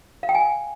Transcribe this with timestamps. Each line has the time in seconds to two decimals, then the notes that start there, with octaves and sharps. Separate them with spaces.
0.23 F5
0.29 G5
0.35 G#5